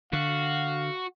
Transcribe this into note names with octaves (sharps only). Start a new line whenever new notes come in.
D3 F#4 F5